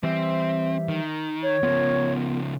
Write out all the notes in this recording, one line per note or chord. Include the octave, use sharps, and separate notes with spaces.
E3 G3 C4 C5 E5
D#3
C#5
C#3 F3 B3 F4 A#4